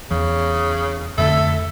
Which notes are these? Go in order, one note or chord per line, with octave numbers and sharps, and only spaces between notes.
E2 C#3
F2 D3 A3 A4 E5